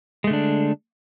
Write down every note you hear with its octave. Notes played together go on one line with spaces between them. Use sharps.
D3 G#3 A3 D4